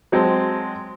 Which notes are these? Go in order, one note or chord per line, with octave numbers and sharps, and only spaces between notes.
F#3 G#3 C4 A5